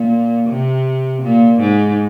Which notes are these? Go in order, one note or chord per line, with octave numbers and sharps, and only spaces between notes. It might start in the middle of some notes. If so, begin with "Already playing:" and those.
Already playing: A#2
C3
A#2
G#2